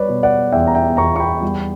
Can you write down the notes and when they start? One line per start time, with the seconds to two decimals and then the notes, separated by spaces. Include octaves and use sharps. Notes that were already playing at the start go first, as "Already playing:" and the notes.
Already playing: G3 B4 C#5 D5
0.08 B2
0.23 D5 F#5
0.52 E2 E5 G5
0.67 A#5
0.75 E5 G5
0.97 E2 A#5 C#6
1.16 C#6
1.20 G5 B5
1.42 G3